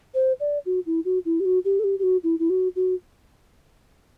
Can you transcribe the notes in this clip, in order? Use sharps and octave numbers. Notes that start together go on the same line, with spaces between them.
C5
D5
F#4
E4
F#4
E4
G4
F#4
G4
A4
G4
G4
F#4
E4
E4
F#4
F#4